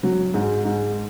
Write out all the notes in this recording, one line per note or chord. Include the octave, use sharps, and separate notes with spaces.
F#3
G#2
G#2